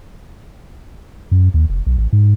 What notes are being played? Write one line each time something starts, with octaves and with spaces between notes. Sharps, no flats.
F#2
D#2
F1
B1
A1
G#2